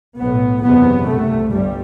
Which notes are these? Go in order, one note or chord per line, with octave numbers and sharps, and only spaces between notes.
B1 A2 B3
F#1 E2 C3 B3
C2 C3 A3
G1 G2 G3